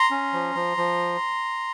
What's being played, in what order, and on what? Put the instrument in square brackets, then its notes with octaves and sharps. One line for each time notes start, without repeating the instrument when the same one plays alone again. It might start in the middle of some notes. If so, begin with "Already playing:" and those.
Already playing: [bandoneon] A#5 C6
C#4
F3
F3
F3